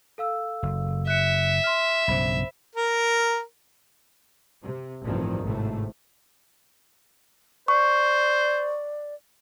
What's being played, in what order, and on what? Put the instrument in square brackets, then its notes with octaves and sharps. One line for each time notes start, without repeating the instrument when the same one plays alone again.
[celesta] A4 F5 E6
[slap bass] F#1
[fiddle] E5 [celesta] F#6 C#7
[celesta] C6 F6
[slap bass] B1 G2 C#3 [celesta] C5 B5
[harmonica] A#4
[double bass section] C3
A1 G2 C3 D#3 F3
G#1 A2 C3 A3
[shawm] C5 [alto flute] D5 [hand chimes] C#6